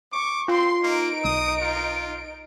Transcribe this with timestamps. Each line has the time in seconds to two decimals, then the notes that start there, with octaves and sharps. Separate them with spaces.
0.12 C#6 D6
0.48 C4 F4 C6 C7
0.84 A#3 D#4 D7
1.25 B1 D#6
1.61 F4